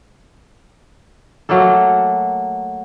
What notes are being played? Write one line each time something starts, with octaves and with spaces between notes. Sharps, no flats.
F#3 A3 A#3 A4